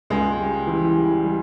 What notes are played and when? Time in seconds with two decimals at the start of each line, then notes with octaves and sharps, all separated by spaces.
0.10 C#2 G#3
0.39 G3
0.67 E3
0.96 G3
1.24 G3